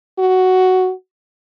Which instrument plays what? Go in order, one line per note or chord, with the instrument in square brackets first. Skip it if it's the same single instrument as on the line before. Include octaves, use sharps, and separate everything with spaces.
[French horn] F#4